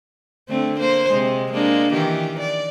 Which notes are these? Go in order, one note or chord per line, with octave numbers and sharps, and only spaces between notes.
D3 A3 C4
A#3 C5
C3 G#3
G#3 A#3 D4
D#3 E3 G4
D5